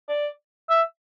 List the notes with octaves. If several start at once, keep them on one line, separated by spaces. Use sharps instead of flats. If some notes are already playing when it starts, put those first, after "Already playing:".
D5
E5